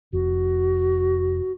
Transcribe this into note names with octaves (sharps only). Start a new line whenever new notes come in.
F1 F#4